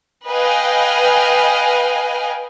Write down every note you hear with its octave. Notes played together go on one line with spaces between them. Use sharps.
B4 D#5 F5 G5 G#5